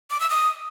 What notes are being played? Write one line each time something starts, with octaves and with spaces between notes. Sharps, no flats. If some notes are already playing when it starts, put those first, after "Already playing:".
D6
E6
D#6